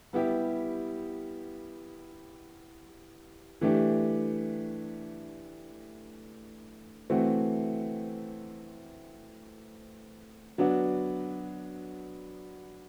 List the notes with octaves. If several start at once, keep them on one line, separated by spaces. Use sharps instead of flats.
G3 B3 E4 G4
E3 A3 D4 G4
E3 A3 C4 F#4
F#3 B3 D4 F#4